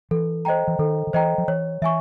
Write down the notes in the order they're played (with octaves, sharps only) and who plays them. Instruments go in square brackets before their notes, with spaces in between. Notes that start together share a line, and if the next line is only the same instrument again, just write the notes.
[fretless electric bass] E3 [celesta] A4
[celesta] C5 D#5 G5 A#5
[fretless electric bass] E3
[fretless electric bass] D#3 [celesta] A4
[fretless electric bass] D#3
[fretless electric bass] E3 [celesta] C5 D#5 G5 A#5
[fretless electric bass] F3
[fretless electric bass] E3 [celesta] C#5
[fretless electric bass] E3 [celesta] E5 G#5 C#6